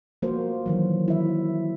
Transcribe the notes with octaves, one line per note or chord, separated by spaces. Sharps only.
F3 A#3 F#4 A#4 C5
D#3 E3 F#3
E4 E5